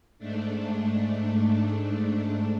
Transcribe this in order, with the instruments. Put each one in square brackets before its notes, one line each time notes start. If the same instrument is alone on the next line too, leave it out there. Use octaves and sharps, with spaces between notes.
[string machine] G#2 A3 D4